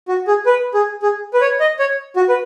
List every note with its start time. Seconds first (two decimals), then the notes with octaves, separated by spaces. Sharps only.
0.08 F#4
0.27 G#4
0.46 B4
0.74 G#4
1.02 G#4
1.34 B4
1.41 C#5
1.60 D#5
1.79 C#5
2.16 F#4
2.29 B4